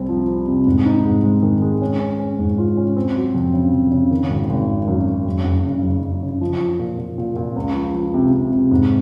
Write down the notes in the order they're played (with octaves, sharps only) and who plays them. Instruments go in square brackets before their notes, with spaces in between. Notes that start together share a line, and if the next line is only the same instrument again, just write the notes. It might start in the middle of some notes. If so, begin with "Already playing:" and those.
Already playing: [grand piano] C2 C3 C4
F3
C4
C3
G#2
D#4
G#2
G#3
D#3
G#3
C#4
C#4
C#4
G#2
F4
C#4
C4
F#3
F2
C#3
F2
C#3
D#3
G#1
G#1
D#3
F#2
F#2
F#1
F#1
C#3
F#1
F#1
C#3
F3
F3
A#2
A#2
A#2
A#2
C#2
F3
F3
C3
C3
C3
G#2